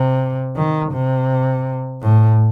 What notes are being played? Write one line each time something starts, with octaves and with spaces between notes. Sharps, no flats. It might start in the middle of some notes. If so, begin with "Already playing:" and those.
Already playing: C3
D#3
C3
A2